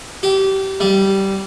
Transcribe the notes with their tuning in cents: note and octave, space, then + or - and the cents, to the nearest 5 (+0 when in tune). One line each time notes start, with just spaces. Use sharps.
G4 -25
G3 -10